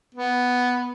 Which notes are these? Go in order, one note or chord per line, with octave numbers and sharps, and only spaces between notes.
B3